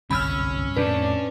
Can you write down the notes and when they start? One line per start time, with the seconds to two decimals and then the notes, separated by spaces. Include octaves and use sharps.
0.11 G1 C2 F#2 C#4 B5 E6 F6
0.76 F2 A2 D4 B4